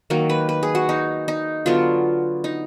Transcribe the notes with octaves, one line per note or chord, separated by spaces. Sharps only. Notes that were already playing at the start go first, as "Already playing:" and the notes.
D#3 F#3 A#3
B4
B4
G#4
F#4
D#4
D#4
D3 F#3 B3 F4
D#4